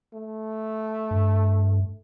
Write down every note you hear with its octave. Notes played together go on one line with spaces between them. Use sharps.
A3
G2